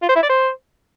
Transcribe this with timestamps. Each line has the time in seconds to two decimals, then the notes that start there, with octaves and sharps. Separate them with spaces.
0.02 F4
0.09 C5
0.16 E4
0.23 D5
0.30 C5